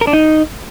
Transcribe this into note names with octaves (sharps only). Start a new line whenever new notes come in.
A#4
D4
D#4